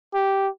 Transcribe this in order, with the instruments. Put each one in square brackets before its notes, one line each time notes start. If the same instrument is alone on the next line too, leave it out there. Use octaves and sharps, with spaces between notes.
[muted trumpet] G4